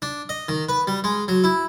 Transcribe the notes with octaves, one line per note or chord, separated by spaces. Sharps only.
D4
D#5
D#3
B4
G3
G#3
F#3
E4